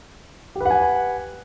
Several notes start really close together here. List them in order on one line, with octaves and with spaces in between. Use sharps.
G4 B4 F#5 G#5